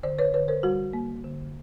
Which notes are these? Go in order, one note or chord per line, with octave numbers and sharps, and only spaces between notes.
D3 C5 D5
B4 C#5
D3 B4 C#5
A#4 C5
G3 F#4
A#3
D3